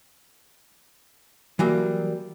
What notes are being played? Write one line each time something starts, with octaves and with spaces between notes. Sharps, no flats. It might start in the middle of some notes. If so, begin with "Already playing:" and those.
E3 F#3 G3 A#3